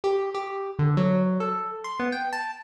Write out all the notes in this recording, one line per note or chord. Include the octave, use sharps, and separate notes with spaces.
G4
G4
D3
F#3
A4
C6
B3
G5
A5